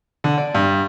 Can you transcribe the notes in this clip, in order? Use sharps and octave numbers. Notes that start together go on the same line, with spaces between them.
D3
D5
G2